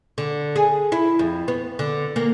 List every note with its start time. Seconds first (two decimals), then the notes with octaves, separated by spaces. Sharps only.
0.18 D3
0.56 G#4
0.92 E4
1.19 F2
1.48 B3
1.79 D3
2.16 A#3